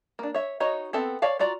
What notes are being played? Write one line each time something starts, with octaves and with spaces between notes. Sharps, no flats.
A#3 D4
C#5 E5
D#4 F#4 C#5 D#5
B3 C4 A4 E5
C#5 D5 F5 A5
F4 F#4 D5 A#5